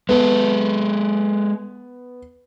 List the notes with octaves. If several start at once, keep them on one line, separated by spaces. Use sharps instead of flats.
G#3 B3 A4